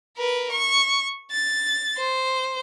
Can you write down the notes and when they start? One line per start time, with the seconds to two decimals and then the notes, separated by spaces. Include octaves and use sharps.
0.17 A#4 B4
0.51 C#6
1.31 A6
1.97 C5